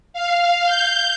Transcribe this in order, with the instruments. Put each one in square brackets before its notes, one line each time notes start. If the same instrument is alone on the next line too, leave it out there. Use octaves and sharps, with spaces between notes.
[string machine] F5
G6